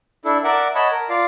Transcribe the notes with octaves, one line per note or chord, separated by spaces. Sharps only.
D4 E4 A4
A#4 D5 E5 F#5
C#5 D#5 F#5 A5 B5
A#4
F4 D5 F5